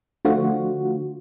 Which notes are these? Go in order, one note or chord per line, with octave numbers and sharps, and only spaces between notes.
D3 F3 A3 F4 F#4